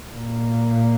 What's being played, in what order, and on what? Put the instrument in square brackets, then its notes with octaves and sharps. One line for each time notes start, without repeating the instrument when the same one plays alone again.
[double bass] A#2